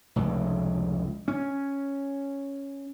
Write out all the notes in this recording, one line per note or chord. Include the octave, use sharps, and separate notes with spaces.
F1 C#2
C#4